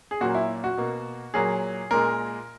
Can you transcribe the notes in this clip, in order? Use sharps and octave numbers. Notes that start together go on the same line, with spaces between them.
G#4
A#2 F#3 A#3 F#4
E4
F#4
B2 A#3
A#2 F#3 A#3 G#4
A#2 G#3 A#4